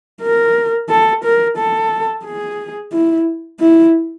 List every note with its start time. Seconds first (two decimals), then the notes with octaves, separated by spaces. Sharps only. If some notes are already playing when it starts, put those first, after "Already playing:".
0.22 A#4
0.90 A4
1.24 A#4
1.57 A4
2.25 G#4
2.93 E4
3.60 E4